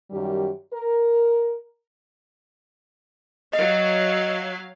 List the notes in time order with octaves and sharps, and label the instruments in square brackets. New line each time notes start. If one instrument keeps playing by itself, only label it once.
[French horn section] F#2 D#3 G3 G4
A#4
[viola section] F#3 F5 [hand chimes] D#5